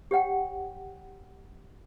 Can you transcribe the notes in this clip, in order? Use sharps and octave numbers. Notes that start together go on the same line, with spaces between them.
G4 C#5 F#5 G5